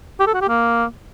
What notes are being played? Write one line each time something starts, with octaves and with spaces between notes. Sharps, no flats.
G4
A4
F#4
G4
A#3